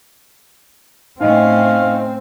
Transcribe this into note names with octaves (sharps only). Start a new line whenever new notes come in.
A2 C4 C#4 D#4 D#5 F5 G5